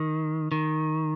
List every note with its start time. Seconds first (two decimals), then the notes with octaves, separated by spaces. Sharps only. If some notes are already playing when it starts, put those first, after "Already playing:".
Already playing: D#3
0.52 D#3